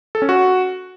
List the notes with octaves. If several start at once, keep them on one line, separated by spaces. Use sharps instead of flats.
A4
C#4
F#4